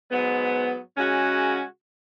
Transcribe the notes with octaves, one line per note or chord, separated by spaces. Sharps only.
G#2 F#3 B3
C#3 G#3 C#4 F#4